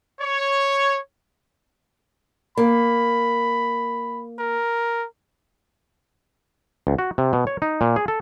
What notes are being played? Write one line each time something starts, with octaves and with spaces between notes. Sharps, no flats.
C#5
A#3 B5
A#4
C#2
F#4
C3
B2
C#5
D#4
A#2
G#4
A4